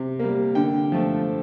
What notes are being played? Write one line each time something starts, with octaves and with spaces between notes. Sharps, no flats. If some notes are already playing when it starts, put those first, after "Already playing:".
Already playing: C3
G3 A#3
D3 G5
F3 A3